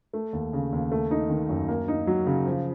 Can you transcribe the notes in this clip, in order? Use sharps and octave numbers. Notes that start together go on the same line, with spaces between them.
A3
D#2
C#3
D#2
A3
D#4
D#3
F#2
A#3
D#4
F#3
C#3
F3